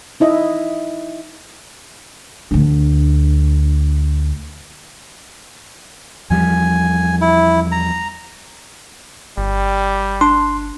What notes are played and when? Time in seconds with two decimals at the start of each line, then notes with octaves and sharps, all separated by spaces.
0.20 D#4 E4 D#5 E5
2.51 D2 D4
6.30 E2 F3 G3 G#5
7.21 E4
7.72 A#5
9.38 G1 G3
10.21 D4 C6